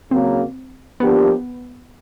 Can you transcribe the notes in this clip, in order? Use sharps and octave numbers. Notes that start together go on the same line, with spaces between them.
C#3 F#3 A#3 C4
F3 A#3 B3 D4 G4